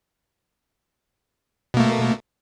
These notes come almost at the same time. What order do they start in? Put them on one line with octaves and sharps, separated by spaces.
B2 A#3 A3